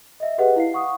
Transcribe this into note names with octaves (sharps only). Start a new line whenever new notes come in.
D#5 E5
G4 G#4 B4 D#5 F#5
E4 F5 C7
F5 F#5 C#6 D#6